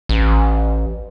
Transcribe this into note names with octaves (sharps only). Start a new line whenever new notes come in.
A1